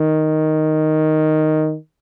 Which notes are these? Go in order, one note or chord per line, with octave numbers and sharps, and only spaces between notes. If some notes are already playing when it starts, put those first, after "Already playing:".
Already playing: D#3